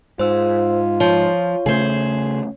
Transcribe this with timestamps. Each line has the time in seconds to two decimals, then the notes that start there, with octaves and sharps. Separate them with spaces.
0.19 G#2 F4 C5 E6
1.00 F3 C#5
1.66 C#3 A3 C#4 G#4 C5